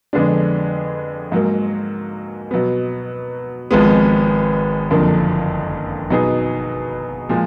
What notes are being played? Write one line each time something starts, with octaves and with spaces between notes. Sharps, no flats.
F2 D3 G#3 B3 D4
G#2 F#3 A#3
B2 F#3 B3
G#1 G#2 F3 G#3 B3
F#1 F2 D3 F3 A#3
B2 F#3 B3 D#4 G#4
A#2 F3 G#3